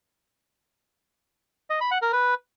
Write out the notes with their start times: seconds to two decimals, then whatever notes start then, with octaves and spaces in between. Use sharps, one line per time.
1.70 D#5
1.81 B5
1.91 F#5
2.02 A#4
2.13 B4